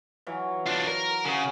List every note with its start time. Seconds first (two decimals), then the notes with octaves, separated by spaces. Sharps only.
0.27 E3 F#3 F5
0.66 D4 F4
0.87 A#4
1.25 C#3 F#4 G#4